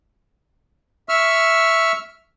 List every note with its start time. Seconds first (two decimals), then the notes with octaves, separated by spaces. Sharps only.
1.09 E5 C#6 E6 F6